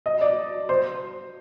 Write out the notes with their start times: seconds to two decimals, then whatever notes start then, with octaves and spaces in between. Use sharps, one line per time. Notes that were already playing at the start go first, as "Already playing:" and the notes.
0.06 D#5
0.21 D5
0.69 C5